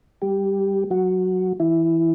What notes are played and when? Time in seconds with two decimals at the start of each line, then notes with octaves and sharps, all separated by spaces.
0.22 G3 G4
0.91 F#3 F#4
1.60 E3 E4